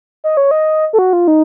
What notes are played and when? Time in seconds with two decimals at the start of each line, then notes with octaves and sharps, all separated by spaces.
0.24 D#5
0.37 C#5
0.51 D#5
0.93 A4
0.99 F#4
1.13 F4
1.28 D#4